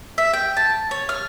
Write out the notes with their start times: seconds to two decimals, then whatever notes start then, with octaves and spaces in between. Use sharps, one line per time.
0.18 E5
0.34 G5
0.57 A5
0.91 C#5
1.09 F6